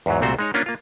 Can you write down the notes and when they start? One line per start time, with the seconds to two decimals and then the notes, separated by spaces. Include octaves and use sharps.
0.06 E2 G#2 F#3
0.21 C2 A#2 A3 C4 F#4 C5
0.39 G#3 D#4 C#5
0.54 A#3 C#4 D4 F4
0.66 A#3 F4